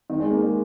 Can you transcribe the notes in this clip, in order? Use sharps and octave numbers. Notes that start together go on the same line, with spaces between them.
D#3
G#3
A#3
G#3